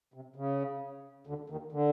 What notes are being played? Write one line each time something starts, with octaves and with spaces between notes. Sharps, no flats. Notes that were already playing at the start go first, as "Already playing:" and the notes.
C3
C#3
D2 D3
D#2 D#3
D3